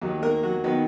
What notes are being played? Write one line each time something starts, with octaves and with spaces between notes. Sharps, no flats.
D#2 D#3 F#3
A#3 A#4
F#3 F#4
D#3 F#3 B3